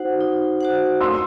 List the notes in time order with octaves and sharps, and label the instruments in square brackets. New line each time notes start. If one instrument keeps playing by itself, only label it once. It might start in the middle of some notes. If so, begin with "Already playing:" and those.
Already playing: [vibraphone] D#4 F#4 C5 F#5
D#4
F#4 C5 F#5
[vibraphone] A3 [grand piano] C6 E6